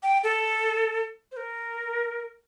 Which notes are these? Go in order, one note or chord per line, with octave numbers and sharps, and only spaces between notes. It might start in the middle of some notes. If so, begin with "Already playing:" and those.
G5
A4
C5
A#4